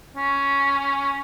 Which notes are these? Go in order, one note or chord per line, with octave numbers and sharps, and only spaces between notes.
C#4